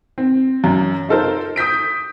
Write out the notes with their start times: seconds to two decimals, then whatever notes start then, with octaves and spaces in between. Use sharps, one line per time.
0.18 C4
0.64 F#2
1.09 D#4 F4 A4 A#4 C5
1.56 D#6 G6 B6 D7